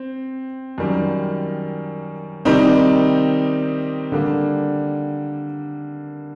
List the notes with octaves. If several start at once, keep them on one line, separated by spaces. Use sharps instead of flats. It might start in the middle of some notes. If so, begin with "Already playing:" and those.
Already playing: C4
F#2 D#3 G3
C3 D#3 G3 C4 D#4
D3 G3 A#3